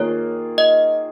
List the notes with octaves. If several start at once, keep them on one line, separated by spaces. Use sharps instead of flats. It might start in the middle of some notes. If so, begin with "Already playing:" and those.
Already playing: D#3 A#3 F4 G#4 C#5
D#5